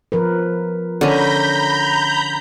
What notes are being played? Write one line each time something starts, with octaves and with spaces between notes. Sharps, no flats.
F3 A#4 B4
D3 C#4 A#5 B5 G6